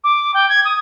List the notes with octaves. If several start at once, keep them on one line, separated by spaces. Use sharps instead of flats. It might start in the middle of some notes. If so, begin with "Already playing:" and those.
D6
G5
G#6
D#6